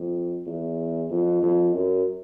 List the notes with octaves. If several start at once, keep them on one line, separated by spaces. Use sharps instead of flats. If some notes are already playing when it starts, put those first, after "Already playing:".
Already playing: F2
E2
F2
F2
F#2